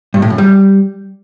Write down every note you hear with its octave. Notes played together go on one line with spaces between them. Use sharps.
G2
A2
F#2
G3